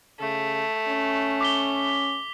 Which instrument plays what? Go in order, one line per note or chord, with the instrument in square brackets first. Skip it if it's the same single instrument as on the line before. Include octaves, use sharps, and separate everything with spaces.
[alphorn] C#3 [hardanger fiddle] A3
[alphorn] C#4
[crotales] D6 B6 G7